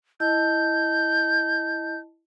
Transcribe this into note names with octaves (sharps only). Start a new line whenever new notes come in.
E4 D#5 A5 G6